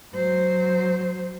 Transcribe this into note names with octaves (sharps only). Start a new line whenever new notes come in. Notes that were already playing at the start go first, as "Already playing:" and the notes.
F#3 C5